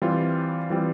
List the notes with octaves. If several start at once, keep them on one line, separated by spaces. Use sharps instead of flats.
E3 G3 C4 F4
E3 G3 C4 F4